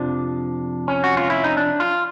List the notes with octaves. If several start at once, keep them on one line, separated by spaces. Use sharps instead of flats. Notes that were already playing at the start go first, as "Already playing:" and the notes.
Already playing: F2 C3 F3 D4
C#4
F#4
F4
E4
D#4
D4
F4